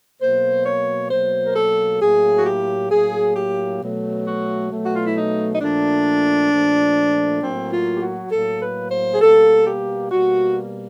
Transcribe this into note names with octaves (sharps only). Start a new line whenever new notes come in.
B2 F#3 A#3 C5
C#5
B2 F#3 A#3 C5
A#4
A4
A2 F#3 A#3 G#4
F#4
G4
A2 F#3 A#3 G#4
G4
B2 F#3 A3
F#4
B2 F#3 A3
F#4
F4
E4
D#4
D#4
A#2 F3 A3 D4
A#2 F3 A3
A2 F#3 A#3 C4
F4
G4
F#4
A2 F#3 A#3 A4
B4
C5
G#4
B2 G3 A#3 A4
G4
B2 G3 A#3 F#4